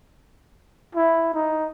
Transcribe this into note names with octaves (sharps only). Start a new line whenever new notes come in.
E4
D#4